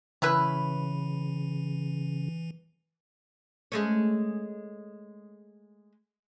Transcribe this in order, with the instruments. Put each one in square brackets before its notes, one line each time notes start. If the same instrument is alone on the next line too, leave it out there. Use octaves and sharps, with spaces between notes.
[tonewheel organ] C#3 [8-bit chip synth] E3 [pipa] C#4 E4 B4
[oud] G#3 A3 C#4